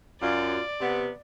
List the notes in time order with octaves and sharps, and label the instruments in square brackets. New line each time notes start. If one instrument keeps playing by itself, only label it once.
[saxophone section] F#2 F4 [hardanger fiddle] D5
[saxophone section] C3 B3